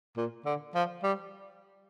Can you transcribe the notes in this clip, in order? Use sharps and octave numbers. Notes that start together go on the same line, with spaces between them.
A#2
D3
F3
G3